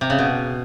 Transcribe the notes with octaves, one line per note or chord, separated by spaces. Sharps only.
C3
C#3
B2